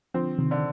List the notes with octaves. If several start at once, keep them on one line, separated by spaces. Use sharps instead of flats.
D3 F3 C4
C3 D#3
D3